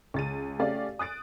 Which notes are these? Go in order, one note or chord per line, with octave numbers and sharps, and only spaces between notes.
C#2 A6 D#7
A3 C#4 G4 D5 F5
D#6 F#6 A6 D7